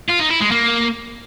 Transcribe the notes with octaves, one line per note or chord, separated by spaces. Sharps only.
F4
D#4
E4
G#3
A#3